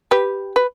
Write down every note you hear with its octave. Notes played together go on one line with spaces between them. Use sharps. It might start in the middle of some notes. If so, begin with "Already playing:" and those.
G4 B4
B4